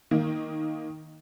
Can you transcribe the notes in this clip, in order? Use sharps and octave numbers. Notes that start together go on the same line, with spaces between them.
D#3 A#3